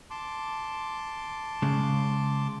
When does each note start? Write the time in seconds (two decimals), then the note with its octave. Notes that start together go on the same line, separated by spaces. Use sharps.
0.11 A5 C6 D6
1.62 C#3 G#3